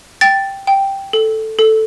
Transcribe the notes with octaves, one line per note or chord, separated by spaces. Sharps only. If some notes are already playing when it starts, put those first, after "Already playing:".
G5 A6
G5
A4
A4